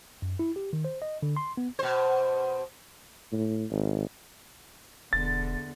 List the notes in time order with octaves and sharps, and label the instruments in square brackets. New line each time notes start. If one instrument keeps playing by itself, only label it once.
[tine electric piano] F#2
E4
G4
D#3
C5
D#5
D3
C6
B3
[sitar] B2 C5
[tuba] A2
G#1
[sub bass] E1 [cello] E2 D3 [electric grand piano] A6